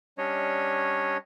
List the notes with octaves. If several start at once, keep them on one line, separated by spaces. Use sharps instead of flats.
G3 C#4 D4 C#5 D#5